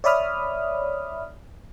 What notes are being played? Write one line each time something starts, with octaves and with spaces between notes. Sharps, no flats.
C#5 D5 E5 B5 D#6 F6